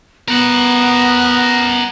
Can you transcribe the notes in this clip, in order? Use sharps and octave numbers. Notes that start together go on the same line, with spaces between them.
B3 A#4 F#5